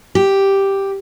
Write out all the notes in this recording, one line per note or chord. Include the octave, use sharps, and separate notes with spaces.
G4